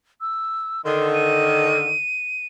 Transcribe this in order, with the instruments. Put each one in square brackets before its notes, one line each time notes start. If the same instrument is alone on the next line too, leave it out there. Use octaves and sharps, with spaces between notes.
[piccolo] E6
[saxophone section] D3 D#3 [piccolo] C6
[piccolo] D#7